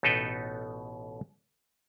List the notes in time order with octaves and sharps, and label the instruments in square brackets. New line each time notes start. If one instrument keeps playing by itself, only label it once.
[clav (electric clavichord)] A1 B2 D#4 A4 B4 G5